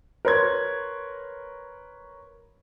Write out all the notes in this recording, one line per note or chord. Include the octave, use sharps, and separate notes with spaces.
A#4 B4 C#5 C6 G#6